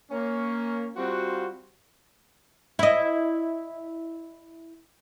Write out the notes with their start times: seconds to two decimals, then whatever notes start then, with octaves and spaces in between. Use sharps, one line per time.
0.12 A#3 C#4
0.96 G3 C4 F4 F#4
2.79 E4 D#5